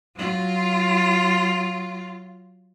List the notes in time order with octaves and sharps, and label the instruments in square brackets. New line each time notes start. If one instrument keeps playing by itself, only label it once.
[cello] F#3 F4